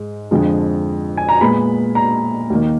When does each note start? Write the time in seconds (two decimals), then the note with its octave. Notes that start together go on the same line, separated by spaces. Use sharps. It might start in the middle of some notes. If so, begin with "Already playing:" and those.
Already playing: G#2 G#3
0.31 F2 D3 F3 G#3
1.17 G#5
1.29 A#5
1.41 A#2 G#3 B3 B5
1.95 A#5
2.50 D#2 D#3 A#3